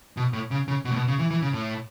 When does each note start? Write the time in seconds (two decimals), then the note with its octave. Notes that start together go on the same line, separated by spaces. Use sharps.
0.17 B2
0.33 A2
0.51 C#3
0.68 C#3
0.85 B2
0.91 A2
0.96 B2
1.08 C#3
1.19 E3
1.31 E3
1.42 C#3
1.53 A2